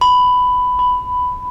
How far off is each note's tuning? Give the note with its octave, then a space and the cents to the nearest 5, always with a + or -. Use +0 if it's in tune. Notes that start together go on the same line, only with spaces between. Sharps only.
B5 +10
B5 +5